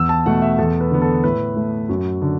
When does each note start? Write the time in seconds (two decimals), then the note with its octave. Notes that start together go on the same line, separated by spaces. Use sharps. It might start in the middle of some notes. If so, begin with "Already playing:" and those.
Already playing: E2 E6
0.09 A5
0.26 B2 A3 F#5
0.42 E5
0.58 E2 A4
0.80 B4
0.91 D3 B3
1.02 A4
1.24 A2 B4
1.56 A3
1.89 F#2 F#4
2.22 D3